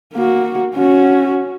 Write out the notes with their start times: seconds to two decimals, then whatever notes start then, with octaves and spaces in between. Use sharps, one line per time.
0.14 A#3 F#4
0.75 C#4 F#4